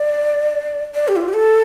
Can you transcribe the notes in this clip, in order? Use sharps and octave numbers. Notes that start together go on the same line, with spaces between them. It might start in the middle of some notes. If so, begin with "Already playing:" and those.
Already playing: D5
D5
G4
E4
F4
G4
A4